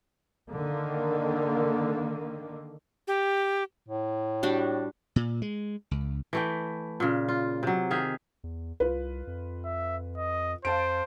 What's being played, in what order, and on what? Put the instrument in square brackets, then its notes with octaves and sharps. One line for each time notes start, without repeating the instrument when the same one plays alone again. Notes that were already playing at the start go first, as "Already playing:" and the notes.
[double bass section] D3 D#3 A#3
[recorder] G4
[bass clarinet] A2
[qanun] G3 D4 F#4
[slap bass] A#2
G#3
C#2
[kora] E3 A3 G5
A#2 C#3
F4
C3 F#3
D#3 G#4 E5 F5
[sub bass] E2
[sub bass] C2 [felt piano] F4 B4
[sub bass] F2
[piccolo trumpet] E5
D#5
[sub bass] F2 [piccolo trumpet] C5 [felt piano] F5 A5 D7